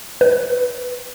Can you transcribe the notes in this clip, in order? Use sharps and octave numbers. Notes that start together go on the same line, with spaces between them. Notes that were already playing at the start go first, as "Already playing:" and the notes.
B4